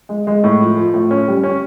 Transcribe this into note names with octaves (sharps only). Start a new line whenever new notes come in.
G#3
G#3
A2
F3
F3
A2
C#4
G3
C#4